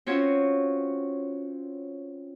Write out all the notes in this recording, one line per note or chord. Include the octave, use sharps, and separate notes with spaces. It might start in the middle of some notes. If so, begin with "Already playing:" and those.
C4 C#4 F4 F#4 C#5